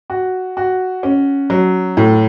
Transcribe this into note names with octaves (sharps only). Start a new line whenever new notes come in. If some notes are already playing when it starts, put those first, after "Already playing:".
F#4
F#4
C#4
F#3
A2